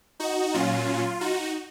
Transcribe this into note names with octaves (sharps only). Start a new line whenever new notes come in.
D#4 F#4
A#2 F#3 C#4 F4
D#4 F#4